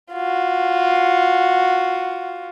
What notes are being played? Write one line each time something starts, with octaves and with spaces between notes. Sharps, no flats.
F4 F#4